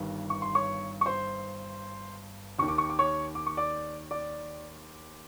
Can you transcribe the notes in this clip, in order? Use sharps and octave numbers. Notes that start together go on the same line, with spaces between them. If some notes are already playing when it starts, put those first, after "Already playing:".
Already playing: G1 G2 D#3
C#6
C6
C#5 C#6
C#6
C5 C6
D#2 D#3 C#6
D6
C#6
D6
C#5 C#6
D6
C#6
D5 D6
D5 D6